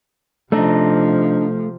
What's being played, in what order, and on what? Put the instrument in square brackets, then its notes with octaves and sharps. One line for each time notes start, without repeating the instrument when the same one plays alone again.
[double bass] C3 F3 [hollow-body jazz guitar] A3 [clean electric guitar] D4 D#4